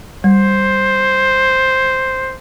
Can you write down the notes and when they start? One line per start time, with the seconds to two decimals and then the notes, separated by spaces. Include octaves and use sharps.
0.24 G3 C5